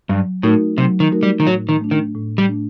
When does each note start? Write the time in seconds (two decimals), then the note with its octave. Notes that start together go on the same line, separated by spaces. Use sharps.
0.09 G2 F#3
0.43 A2 A3 D#4 F#4 A#4
0.77 C3 F#3
1.00 D#3
1.12 A3 D#4 F#4 A#4
1.23 G3
1.40 D#3
1.46 A2 F#3
1.69 D#3
1.81 A3 D4
1.91 D#3
2.15 A2
2.38 G3
2.49 A3 D4